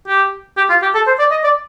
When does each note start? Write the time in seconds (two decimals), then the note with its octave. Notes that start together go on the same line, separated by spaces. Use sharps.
0.08 G4
0.57 G4
0.69 F4
0.82 G4
0.94 A4
1.07 C5
1.19 D5
1.31 D#5
1.44 D5